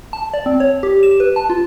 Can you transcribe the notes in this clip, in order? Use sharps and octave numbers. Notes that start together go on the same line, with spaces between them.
A5
D5
C4
C#5
G4
E7
B4
A5
F4